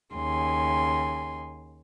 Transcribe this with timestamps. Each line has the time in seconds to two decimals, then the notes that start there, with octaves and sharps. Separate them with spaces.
0.14 D#2 C#3 G#5 C6